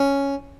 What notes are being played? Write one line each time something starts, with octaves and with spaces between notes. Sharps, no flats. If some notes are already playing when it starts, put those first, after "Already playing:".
Already playing: C#4